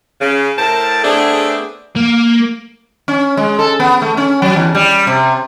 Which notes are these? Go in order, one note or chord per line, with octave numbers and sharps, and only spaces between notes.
C#3
A2 A#4 C5 G5 A5
A3 B3 C4 D4 G#4
A#3
C#4
G#3
A4
B3
A3
C#4
F#3
E2
G3
C3